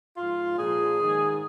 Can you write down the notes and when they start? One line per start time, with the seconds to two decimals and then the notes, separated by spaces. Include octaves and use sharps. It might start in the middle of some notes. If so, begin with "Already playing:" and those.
0.17 G#2 F3 F4
0.58 A#2 F3 G#4
1.00 G#2 D#3